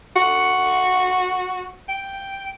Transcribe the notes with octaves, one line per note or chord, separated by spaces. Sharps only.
F#4
G5